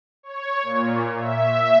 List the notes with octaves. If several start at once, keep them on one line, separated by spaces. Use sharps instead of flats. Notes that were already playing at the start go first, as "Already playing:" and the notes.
C#5
A#2
E5